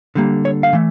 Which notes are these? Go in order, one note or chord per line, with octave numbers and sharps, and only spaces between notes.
D3 G3 A#3
C#5
F5
E3 A3